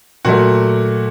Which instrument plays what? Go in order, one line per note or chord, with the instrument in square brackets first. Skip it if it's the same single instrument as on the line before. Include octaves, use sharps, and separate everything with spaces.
[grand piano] A#2 F#3 A3 F#4